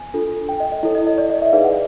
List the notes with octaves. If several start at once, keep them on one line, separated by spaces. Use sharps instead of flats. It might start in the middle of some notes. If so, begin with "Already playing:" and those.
Already playing: G#5
D4 F4 A4
G5
D#5
D#5
E4 A4 C#5 D#5
D#5
D#5
D5
D#5
E5
D#4 G#4 B4 D5 F5
F#5